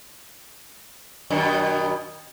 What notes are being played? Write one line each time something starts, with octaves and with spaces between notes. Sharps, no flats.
F#2 B2 D#3